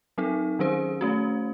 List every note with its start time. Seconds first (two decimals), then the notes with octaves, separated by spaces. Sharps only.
0.18 F#3 C4 D#4 A4
0.59 D#3 F#3 C#4 G#4 C5
1.01 A3 C#4 F#4